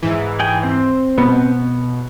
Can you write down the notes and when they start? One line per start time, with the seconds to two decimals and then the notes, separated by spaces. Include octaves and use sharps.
0.03 G#2 E3
0.40 G#4 G5 G#5
0.63 C4 C5
1.18 B2 B3